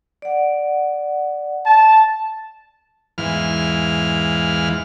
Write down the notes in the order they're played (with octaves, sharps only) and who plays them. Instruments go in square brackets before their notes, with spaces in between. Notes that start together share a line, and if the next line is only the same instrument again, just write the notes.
[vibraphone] D5 F#5
[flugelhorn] A5
[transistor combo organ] E2 G#2 E3 F5 F6